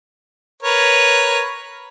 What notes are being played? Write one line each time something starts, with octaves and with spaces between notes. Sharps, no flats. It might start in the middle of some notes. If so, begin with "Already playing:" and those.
A#4 B4 C#5